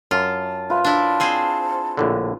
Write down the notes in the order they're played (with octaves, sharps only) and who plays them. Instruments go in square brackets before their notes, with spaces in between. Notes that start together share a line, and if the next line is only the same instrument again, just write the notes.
[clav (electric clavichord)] F#2 [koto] F4 [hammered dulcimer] A5
[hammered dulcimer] F4 B4 [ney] E5
[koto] D4 E4 [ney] A5
[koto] C4 G#4 C5
[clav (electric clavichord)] A#1 A2 D3